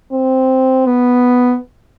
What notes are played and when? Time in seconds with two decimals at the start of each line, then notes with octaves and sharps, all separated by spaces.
0.12 C4
0.86 B3